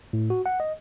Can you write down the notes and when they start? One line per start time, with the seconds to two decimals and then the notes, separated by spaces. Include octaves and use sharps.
0.13 A2
0.30 F#4
0.46 F#5
0.60 D#5